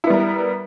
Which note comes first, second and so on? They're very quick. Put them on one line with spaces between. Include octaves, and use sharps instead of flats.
E4 B3 G3 A#4